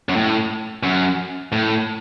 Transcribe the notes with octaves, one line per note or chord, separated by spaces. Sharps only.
F#2
A2
F#2
A2